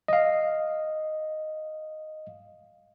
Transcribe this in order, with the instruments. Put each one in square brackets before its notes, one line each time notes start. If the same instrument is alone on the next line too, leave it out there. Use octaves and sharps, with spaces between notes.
[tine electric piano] D#5 F5